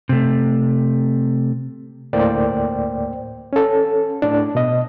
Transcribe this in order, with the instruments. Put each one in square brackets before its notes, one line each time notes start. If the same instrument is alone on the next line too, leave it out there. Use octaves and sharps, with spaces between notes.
[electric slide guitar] C3 A3
[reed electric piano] D2 A2 A#3 C5 D5 G5
C#4 A4
A2 D4
B2 D#5